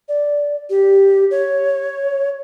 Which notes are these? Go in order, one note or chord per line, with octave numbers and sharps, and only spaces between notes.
D5
G4
C#5